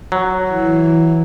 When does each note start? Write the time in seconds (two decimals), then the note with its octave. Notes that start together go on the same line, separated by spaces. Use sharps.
0.12 F#3
0.50 E3